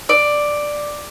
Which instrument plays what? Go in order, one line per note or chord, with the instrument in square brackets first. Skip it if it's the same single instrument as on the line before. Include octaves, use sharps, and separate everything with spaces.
[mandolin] D5